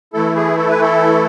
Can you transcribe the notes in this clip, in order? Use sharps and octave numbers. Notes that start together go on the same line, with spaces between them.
E3 A3 E4 A4
G#4
A4
B4
A4